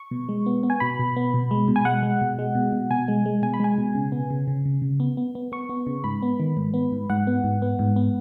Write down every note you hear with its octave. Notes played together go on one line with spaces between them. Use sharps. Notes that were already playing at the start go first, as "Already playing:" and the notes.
Already playing: C#6
B2
G#3
B3
B3
G#5
B2 B5
B2
B3
B2
G#3
B2
G#5
G#3 F#5
G#3
B2
G#3
B2
B2
B2 G#5
G#3
G#3
B2 G#5
B5
G#3 G#5
B2
C#3
B3
C#3
C#3
C#3
C#3
B3
B3
B3
B3 C#6
B3
C#3
G#2 B5
B3
D#3
G#2
B3
G#2
G#2 F#5
B3
G#2
B3
G#2
B3